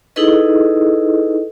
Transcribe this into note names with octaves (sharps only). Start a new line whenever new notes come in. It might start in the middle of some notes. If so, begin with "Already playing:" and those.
D#4 E4 G#4 A4 B4 D#5